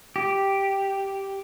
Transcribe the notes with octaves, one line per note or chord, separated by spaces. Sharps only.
G4